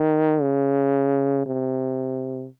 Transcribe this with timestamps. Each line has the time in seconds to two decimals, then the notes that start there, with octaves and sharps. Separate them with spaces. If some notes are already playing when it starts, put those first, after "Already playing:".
Already playing: D#3
0.42 C#3
1.46 C3